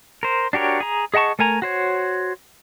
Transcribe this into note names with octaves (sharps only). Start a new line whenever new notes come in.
A#4 C5
D4 F#4 G4 A#4 C#5
G#4 A#5
G#4 D#5 F#5 A5 C#6
A3 A#4 G#5 A#5
F#4 C5 C#5